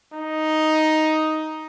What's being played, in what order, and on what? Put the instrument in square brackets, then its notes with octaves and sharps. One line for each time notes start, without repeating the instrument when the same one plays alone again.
[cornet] D#4